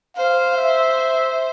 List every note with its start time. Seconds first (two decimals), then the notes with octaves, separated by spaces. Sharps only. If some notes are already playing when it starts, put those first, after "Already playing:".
0.17 C5 F5
0.56 E5